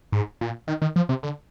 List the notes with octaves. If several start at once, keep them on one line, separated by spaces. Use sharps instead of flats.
G#2
A#2
D#3
D#3
F3
C3
D3